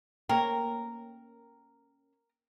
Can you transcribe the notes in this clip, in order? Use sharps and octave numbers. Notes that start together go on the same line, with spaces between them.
A#3 C#4 A#4 G5